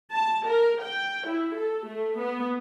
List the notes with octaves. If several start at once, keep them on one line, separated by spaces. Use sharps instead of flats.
A5
A#4
G5
E4
A4
A3
B3